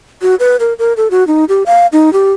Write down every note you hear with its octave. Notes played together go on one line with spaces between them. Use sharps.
F#4
B4
A#4
A#4
A4
F#4
D#4
G4
F5
D#4
G4